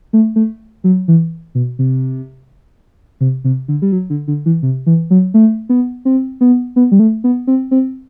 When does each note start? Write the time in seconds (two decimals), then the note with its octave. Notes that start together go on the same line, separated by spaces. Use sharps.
0.13 A3
0.36 A3
0.84 F#3
1.08 E3
1.55 B2
1.79 C3
3.21 C3
3.44 C3
3.68 D3
3.82 G3
3.92 F#3
4.10 D3
4.28 D3
4.46 E3
4.63 C3
4.86 E3
5.10 F#3
5.34 A3
5.69 B3
6.05 C4
6.41 B3
6.76 B3
6.92 G3
6.99 A3
7.24 B3
7.47 C4
7.71 C4